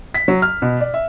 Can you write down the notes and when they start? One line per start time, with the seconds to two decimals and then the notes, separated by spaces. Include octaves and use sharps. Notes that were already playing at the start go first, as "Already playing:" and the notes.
0.14 B6
0.28 F#3
0.42 F6
0.62 B2
0.81 D5
0.94 E5